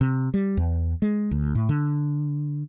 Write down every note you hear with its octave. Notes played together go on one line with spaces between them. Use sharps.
C3
G3
E2
G#3
D2
A2
D3